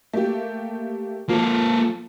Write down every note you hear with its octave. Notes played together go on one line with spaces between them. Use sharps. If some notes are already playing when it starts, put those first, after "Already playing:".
A3 A#3 G4
F3 A#3 A4